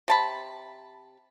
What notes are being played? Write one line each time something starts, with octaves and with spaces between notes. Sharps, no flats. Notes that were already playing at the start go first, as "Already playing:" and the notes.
C3 A5 B5